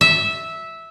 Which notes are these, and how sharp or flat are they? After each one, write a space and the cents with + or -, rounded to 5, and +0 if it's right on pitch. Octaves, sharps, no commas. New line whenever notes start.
E5 -10